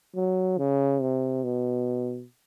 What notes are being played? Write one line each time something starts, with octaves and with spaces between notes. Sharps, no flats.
F#3
C#3
C3
B2